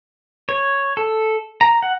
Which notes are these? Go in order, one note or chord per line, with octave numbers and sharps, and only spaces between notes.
C#5
A4
A#5
F#5